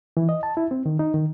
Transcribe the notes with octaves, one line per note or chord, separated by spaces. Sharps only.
E3
D#5
A5
E4
C4
D#3
D#4
D#3